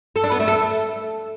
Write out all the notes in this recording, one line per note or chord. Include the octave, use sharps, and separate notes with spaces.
A4
D4
B3
A3
A4